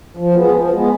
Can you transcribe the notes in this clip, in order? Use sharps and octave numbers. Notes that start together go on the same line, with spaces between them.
F3
G#3 B3
F3
G#3 B3